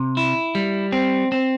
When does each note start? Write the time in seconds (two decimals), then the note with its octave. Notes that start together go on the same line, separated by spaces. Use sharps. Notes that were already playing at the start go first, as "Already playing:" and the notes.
Already playing: C3
0.17 E4
0.55 G3
0.92 C4
1.32 C4